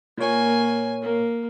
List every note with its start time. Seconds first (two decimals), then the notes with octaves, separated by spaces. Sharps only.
0.18 A#2 A#3 C#5 G#5
1.02 A#3